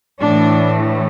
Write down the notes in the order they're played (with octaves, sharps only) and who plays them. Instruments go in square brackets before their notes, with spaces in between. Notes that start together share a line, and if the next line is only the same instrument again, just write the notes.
[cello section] A2 E3 A3 D4